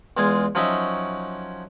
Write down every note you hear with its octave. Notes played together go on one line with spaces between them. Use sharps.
E2 G#3 F4 G#4 G#5
F3 F#3 C#4 D#4 D#5 E5